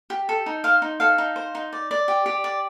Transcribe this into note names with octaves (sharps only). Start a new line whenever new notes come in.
G4
A4
D#4
C5 F5
D#4
A4 F5
D#4
C5
D#4
D5
D5
G4
G4
D5